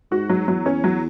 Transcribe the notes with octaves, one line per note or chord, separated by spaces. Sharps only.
G#2 F#4
F#3
E2 F#3
C#4
F#3